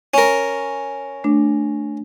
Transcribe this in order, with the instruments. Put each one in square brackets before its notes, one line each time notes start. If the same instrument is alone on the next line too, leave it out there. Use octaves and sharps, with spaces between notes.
[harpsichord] C#4 A#4
[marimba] A3 D4